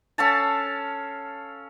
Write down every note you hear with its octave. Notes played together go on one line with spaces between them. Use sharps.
C#4 A4 F5 A5